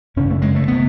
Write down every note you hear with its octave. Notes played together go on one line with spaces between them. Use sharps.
F#2 C#3 C#4
A3
G#3
A3
C#3 B3